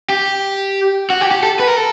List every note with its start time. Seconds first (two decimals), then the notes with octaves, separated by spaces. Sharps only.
0.10 G4
1.10 F#4
1.21 G4
1.31 G4
1.43 A4
1.60 B4
1.67 A#4
1.77 A4